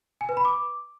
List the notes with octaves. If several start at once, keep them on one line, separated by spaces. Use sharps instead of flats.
G#5
B4
B5
D6